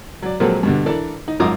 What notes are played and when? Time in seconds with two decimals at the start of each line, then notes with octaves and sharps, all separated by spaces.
0.22 F#3 D5
0.40 A#2 F3 F#3 G#3 C4 A4
0.63 G2 B2 D3
0.86 E3 D4 A4 A#4 D5
1.28 D#4
1.40 G#1 F#2 F4 A#5 D6 D#6